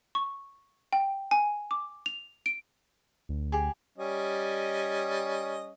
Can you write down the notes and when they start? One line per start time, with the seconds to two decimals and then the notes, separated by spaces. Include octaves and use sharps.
0.15 C#6
0.93 G5
1.31 G#5
1.71 D6
2.06 F7
2.46 D7
3.29 D2
3.52 G4 G#4
3.98 G3 C#4 D#5